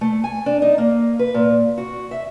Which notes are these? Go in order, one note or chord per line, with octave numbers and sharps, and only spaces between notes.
A3
G#5
D4
D#4
A#3
B4
A#2
F#4
E5